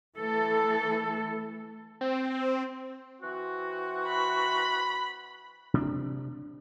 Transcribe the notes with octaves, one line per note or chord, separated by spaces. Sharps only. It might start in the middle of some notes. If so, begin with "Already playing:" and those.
E3 A3 A4
C4
E3 C4 F#4
B5
C3 C4 D4